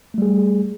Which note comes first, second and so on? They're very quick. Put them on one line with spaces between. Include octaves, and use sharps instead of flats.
A3 G3 G#4